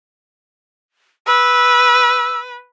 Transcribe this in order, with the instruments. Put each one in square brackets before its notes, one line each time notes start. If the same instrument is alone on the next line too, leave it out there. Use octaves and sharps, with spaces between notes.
[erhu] B4 [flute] E6